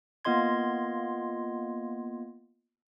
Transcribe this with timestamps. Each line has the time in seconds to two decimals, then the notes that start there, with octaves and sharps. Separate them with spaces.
0.25 A#3 B3 F4 D#5 C6 G#6